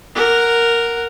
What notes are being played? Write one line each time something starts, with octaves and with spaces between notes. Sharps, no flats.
A#4 F#5